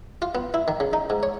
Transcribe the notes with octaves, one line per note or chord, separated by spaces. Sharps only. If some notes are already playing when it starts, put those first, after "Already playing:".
F4
B3
E4
D#3
C#3
D#4
G#2
C#5